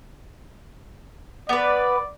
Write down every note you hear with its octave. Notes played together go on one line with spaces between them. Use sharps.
B3 B4 D5